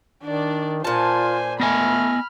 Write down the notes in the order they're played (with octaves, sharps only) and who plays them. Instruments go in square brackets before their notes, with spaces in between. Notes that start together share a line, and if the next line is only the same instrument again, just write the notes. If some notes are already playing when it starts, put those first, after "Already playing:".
[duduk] D#3 [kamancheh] D4 D5
[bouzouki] A#2 A5 [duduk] F4 [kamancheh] C5 G#5
[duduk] A3 [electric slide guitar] B3 D#5 G#5 [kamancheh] B5 F6